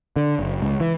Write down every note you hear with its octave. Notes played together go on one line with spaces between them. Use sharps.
D3
F#1
C#2
E3